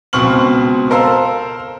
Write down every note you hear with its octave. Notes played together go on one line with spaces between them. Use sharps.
C#2 B2 C4 C#6 F6 F#7
A4 A#4 C5 F5 E6